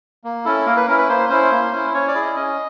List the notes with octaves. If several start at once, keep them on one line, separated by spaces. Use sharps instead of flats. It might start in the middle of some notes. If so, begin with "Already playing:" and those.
A#3
C#4 E4 A4
A#3 A#4
B4
C#4 E4 A#4
B4
A#3 C5
C#4 E4 C5
A#3
C#4 E4
C#4 C#5
D5
E4 G#4
D#5
C#4 D#5